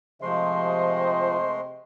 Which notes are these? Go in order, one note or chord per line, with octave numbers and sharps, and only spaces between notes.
C3 F3 G#3 A3 C5 D#5 C6